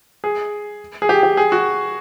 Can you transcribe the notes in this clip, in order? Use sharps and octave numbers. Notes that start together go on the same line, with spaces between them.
G#4
G#4
G4
G4
G#4
F#4